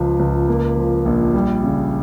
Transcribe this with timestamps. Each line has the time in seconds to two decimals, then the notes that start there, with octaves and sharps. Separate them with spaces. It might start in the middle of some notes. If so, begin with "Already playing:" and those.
Already playing: C#2 F3
0.19 C#2
0.48 A#3
0.77 F3
1.05 A#1
1.34 G3
1.63 C#3